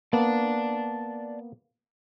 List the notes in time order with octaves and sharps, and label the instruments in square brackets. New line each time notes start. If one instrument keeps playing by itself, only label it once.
[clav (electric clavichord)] A#3 B3 [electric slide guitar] D5 A5